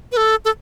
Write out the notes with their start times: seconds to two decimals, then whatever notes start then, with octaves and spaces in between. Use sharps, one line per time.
0.12 B4
0.17 A4
0.45 A4